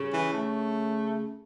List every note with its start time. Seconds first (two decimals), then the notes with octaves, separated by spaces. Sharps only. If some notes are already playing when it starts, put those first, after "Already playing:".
Already playing: C#3
0.13 E3
0.33 A3